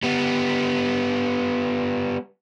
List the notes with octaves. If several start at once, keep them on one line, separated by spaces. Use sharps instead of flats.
G3 B3